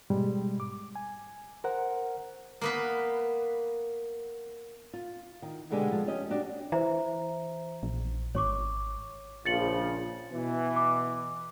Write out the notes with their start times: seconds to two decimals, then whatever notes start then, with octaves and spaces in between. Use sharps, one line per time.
0.10 G#2 B2 G3 G#3
0.60 D6
0.96 G#5
1.64 A#4 C5 F#5
2.61 A#3 B3 B4
4.93 F4
5.42 D#3
5.70 B2 D3 G#3 G4 G#5
5.91 F3 G#3
6.07 C#4 G4 D#5
6.30 D4 F#4 G4
6.72 E3 C5 E5 A#5
7.83 A#1
8.35 G#1 C#5 C#6 D6
9.46 A#1 C#3 F3 A6 C#7 F#7
10.32 B2 E3
10.76 D6